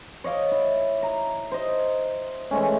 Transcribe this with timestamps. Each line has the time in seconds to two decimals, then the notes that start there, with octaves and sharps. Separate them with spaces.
0.24 C#5 D#5 F5 D6
0.51 E4
1.03 A#5
1.52 C5 D#5
2.51 E3 G#3 A3 C#4